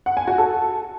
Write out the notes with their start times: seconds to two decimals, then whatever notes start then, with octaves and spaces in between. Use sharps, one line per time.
0.06 F#5
0.17 G#5
0.27 F#4
0.38 A4